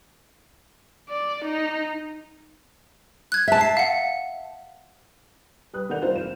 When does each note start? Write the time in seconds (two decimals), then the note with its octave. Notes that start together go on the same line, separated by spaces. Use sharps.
1.09 D5
1.44 D#4
3.32 F#6 G#6
3.48 E5 A5
3.61 C7
3.77 F5 F#5
5.73 G3 B4 D#6 F#6
5.90 D#3 D4 A4 F#5 G6 F7
6.02 G3 A#3 C4 D#4 F4 C5
6.14 F1 E7